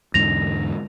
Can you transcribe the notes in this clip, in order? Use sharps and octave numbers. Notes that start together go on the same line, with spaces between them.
E2 G#2 D3 A#6 F7